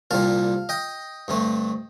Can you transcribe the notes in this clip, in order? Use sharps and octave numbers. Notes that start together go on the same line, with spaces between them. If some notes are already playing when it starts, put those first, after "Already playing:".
C2 A#2 G3 C4 F5 A5
D#5 G5
G2 D3 A3 C4